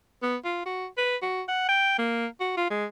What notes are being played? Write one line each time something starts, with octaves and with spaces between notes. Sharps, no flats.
B3
F4
F#4
B4
F#4
F#5
G5
A#3
F#4
F4
G#3